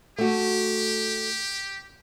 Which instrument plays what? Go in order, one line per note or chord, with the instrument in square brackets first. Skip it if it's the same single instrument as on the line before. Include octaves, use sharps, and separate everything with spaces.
[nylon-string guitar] A3 F#4 [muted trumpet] G4